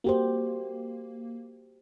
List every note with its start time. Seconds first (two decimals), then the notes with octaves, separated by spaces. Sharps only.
0.04 A#3 F#4 G4 C5